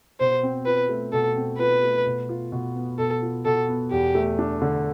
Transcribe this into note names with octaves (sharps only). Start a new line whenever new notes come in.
B2 C5
C4
F4 B4
A3
B2 A4
C4
F4 B4
A3
B2
F4
B2
B3
B2 A4
F4
B2 A4
B3
E2 G4
A3
D4
D3